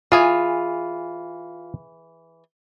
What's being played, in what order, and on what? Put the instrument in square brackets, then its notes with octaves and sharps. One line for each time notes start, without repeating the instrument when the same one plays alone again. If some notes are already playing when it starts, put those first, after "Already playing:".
[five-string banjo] E3 G#4 G#5 [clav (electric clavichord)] F4